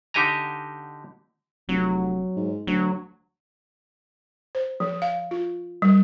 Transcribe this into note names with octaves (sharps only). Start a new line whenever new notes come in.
D3 D#4 G4 D#5 G#5 A#5
F1 F#3
G#2
D2 F#3
C5
F3
F5
F4
G3